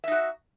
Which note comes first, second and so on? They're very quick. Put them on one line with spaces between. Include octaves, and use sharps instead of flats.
E5 D#4 F#4